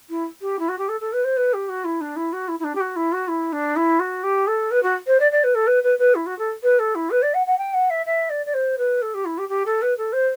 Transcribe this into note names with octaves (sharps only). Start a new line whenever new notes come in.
E4
G4
E4
F#4
G4
A4
A4
B4
C5
B4
G4
F#4
E4
D4
E4
F#4
E4
E4
D4
G4
F#4
E4
F#4
E4
D4
E4
F#4
G4
A4
B4
F#4
C5
D5
D5
B4
A4
B4
B4
B4
E4
F#4
A4
B4
A4
E4
B4
D5
F#5
F#5
G5
F#5
E5
E5
D5
D5
C5
B4
A4
G4
E4
G4
G4
A4
B4
A4
C5